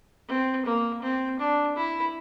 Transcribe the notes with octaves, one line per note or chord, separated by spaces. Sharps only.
C4
A#3
C4
D4
E4